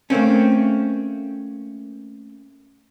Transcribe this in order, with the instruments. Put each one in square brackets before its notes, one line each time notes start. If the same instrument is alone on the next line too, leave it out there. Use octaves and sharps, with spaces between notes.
[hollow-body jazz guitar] A3 A#3 C4 C#4